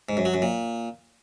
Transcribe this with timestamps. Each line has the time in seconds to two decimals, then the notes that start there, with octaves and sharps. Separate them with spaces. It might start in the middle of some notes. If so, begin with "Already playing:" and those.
0.09 G#2
0.17 F#2
0.25 F#3
0.34 F#2
0.42 A#2